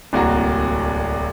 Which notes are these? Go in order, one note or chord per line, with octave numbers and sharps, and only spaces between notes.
D1 C2 A#3 F#4 A#5